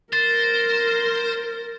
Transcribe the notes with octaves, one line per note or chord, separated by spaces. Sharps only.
A#4 C5 A6